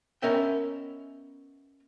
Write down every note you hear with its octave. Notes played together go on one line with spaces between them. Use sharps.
B3 C#4 A#4 D#5 E5 G5